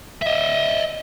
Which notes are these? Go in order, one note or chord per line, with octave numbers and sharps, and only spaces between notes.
D#5 E5